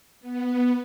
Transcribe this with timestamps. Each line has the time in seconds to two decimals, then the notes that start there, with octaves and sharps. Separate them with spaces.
0.20 B3